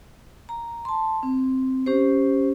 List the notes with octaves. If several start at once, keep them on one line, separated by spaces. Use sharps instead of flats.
A#5
A5 C6
C4
C#4 G4 C5